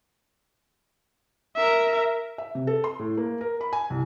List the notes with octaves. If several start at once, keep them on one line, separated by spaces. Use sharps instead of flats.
A#4 E5
E5
C3
A4
C6
A2
A#3
A#4
B5
G#5
C2